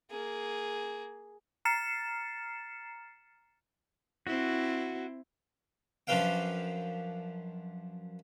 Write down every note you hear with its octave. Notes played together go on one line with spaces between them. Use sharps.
A#3 G#4
A#5 F6 A6 C7 C#7 E7
C4 E4 F#4
F#2 F3 D4 B4 F5 G5